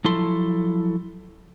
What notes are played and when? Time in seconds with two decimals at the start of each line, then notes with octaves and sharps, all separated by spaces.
0.05 F3 F#3 E4 A4 C6